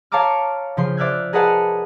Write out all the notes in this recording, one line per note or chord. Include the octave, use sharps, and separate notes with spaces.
C#5 F5 A5 A#5 D6 F6
C#3 F3 C6
C5 D5 E5 F6 F#6 G#6
G#4 A#4 B4 D#5 F#5 A5